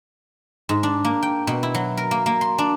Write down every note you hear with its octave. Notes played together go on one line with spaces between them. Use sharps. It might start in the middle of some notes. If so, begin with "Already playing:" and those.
G#2
D4
A#3
G5
B2
E4
F#3
A#4
A#3
A#3
C6
D4